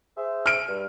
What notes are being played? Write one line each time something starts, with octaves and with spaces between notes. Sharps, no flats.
G#4 C5 E5
F6 D7
G2